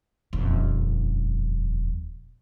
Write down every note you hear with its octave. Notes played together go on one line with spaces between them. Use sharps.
D#1 F2